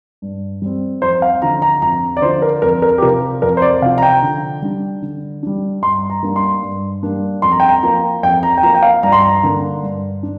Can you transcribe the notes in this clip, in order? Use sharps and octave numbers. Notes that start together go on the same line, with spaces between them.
G2
G3 C4
F2 C5
F5
D3 F3 A#5
A#5
F2 A#5
D5
D3 F3 C5
A#4
F2 A#4
A#4
G4
C3 F3 A#4
F2 A#4
C5
D5
C3 F3 F5
A#5
G5
D3
G3 D4
D3
G3 D4
G2 C6
A#5
G3 A#3 D4
C6
G2
G3 A#3 D4
F2 C6
A#5
G5
A#5
F3 A#3 A#5
F2 G5
A#5
G5
F3 A#3 A#5
G5
F5
G2 A#5
C6
A#5
D3 A#3 D4
G2
D4